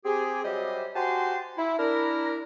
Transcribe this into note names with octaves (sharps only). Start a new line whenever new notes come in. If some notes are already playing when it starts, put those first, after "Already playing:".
C4 G4 G#4
F#3 G3 G4 C5 D#5 E5
F#4 G4 C5 G#5 A5 C6
E4
D4 E4 A#4